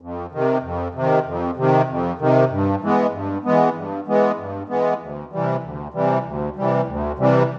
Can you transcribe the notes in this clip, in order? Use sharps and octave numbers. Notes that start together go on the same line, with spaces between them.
F2
C3 D#3
F2
C3 D#3
F2
C3 D#3
F2
C3 D#3
G2
E3 G#3 B3
G2
E3 G#3 B3
G2
E3 G#3 B3
G2
E3 G#3 B3
D2
C3 E3 G3
D2
C3 E3 G3
D2
C3 E3 G3
D2
C3 E3 G3